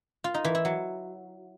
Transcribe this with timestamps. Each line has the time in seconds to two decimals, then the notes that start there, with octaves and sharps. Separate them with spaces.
0.24 F4
0.34 D#4
0.45 E3
0.55 E4
0.65 F#3